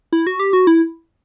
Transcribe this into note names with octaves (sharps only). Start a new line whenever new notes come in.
E4
F#4
G4
F#4
E4